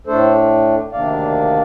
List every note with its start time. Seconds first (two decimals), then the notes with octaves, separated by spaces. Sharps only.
0.07 A2 A3 D4 A4 C5
0.92 D2 C3 D#3 A#3 D4 D5 F5